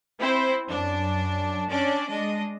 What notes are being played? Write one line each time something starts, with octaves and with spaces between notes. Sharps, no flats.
C4 E4 C5
F#2 D4
C#4 D4 D5
G#3 D4 D#5